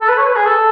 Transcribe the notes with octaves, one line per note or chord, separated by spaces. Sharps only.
A4
B4
C#5
B4
G#4
A4